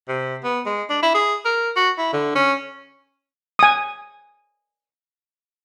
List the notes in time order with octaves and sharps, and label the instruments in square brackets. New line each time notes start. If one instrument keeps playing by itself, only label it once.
[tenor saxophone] C3
B3
G#3
D4
E4
G#4
A#4
F#4
E4
D3
C#4
[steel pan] G#5 D#6